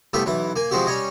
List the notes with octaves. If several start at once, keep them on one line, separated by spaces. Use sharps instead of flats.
C2 A3 B3 F4 G4 B5
B1 E3 B4
A#3 G#5
F3 G#3 C4 F#4 G4
G3 C#4 C#5 D#5